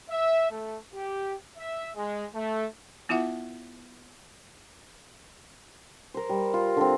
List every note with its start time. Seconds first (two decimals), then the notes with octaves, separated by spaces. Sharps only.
0.11 E5
0.51 A3
0.95 G4
1.58 E5
1.96 G#3
2.35 A3
3.09 B3 E4 F4 E5 F#5
6.14 A#4 C5
6.29 G3
6.54 F4
6.77 D3 C4